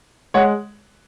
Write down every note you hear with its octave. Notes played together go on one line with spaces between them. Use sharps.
G#3 C#5 F#5